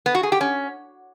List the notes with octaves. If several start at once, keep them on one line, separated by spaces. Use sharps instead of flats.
B3
F#4
G#4
G4
C#4